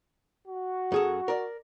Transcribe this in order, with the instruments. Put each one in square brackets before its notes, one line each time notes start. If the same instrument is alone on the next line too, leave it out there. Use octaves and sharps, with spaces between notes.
[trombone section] F#4
[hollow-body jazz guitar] F#2 G#4 A4
A#4 D5